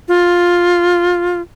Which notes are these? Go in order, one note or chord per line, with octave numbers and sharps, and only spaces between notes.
F4